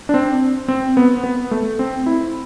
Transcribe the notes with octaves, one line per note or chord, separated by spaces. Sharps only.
D4
C4
C4
B3
B3
A3
C4
E4